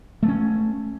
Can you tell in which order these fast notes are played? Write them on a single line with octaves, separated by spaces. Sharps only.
A3 A#3 C#4